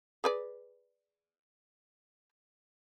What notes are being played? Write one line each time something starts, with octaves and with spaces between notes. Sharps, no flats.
G#4 B4 D5